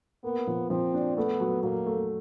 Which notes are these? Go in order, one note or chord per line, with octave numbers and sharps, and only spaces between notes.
A#3 B3
F3
F3 C4
D4
A3 B3
F#3
F#3 A#3
A3